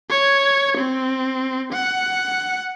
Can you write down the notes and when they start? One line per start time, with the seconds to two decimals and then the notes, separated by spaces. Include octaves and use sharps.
0.10 C#5
0.77 C4
1.73 F#5